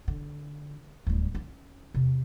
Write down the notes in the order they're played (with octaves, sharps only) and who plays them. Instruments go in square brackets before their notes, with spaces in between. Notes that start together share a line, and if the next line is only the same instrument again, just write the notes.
[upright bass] D3
D1 G3
C#4
E2 C3